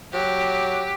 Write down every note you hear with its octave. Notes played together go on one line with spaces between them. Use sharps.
F#3 G4